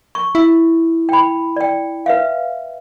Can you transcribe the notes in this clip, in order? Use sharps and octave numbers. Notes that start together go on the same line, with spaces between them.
C#6
E4
G5 B5
D5 G5
B4 E5 F5